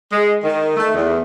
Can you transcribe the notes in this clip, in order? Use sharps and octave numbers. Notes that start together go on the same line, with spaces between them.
G#3
D#3
A3
E2